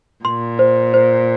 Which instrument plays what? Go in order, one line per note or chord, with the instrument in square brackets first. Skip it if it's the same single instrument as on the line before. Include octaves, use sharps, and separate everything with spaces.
[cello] A#2 [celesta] C6
[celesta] C5
C5